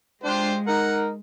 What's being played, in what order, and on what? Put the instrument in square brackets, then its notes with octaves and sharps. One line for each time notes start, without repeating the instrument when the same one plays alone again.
[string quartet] G#3 [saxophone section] D4 [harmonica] F4 G4 C5
[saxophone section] D#4 A#4 [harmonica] F#5